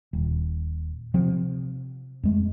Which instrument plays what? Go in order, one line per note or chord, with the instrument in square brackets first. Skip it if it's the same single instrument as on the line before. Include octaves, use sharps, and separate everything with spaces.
[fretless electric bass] D#1
C3 F3 C4
F2 G#3 A3